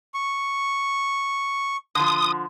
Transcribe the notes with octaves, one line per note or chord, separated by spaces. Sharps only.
C#6
D3 F3 D#6